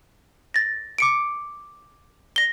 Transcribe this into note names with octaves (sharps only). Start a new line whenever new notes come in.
A6 A#6
D6 C#7 D7
A#6 G7